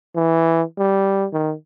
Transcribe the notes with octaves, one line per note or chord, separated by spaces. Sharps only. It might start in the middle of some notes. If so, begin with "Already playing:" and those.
E3
G3
D#3